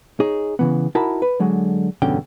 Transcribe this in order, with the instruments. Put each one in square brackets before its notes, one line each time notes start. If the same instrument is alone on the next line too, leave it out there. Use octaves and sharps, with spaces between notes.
[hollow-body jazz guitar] D#4 G#4 C#5
C#3 E3 B3
D#4 E4 F#4 A#4 A5 B5
B4
D3 F#3 G#3
E2 G2 B2 D3 C#4 G5